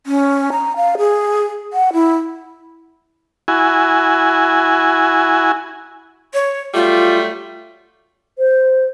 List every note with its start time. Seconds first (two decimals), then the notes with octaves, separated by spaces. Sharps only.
0.06 C#4
0.52 A#5
0.76 F5
0.98 G#4
1.73 F#5
1.93 E4
3.48 E4 F#4 G#5
6.34 C#5
6.74 F#3 G3 A3 F4
8.39 C5